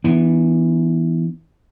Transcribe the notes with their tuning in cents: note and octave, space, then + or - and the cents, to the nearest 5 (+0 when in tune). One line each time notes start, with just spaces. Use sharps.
E3 +0 B3 +0 D4 +45